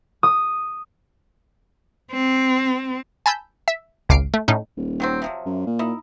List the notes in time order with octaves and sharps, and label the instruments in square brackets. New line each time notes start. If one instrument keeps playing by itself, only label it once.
[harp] D#6
[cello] C4
[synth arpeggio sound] G#5 A5 B5 E6 G6
E5
G#1 C#2 D6 F6 C7 D7
A3
A2 C#4 D#4
[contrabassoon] D#1
[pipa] D#3 F#3 C4
C3 F3 F#3
[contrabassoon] F#2
A#2
[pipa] D#4 E4